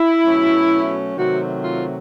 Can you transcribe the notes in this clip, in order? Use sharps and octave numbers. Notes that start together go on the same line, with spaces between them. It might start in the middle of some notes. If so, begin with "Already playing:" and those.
Already playing: E4
B2 F#3 A3 C#4
C3 D#3 F#3 A3 C4 F#4
F4